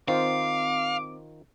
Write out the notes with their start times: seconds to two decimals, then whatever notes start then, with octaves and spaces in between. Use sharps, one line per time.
0.08 D#3 C4 F4 C5 F5 D6